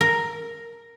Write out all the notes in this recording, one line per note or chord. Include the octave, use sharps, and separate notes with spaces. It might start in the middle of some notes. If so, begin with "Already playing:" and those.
A#4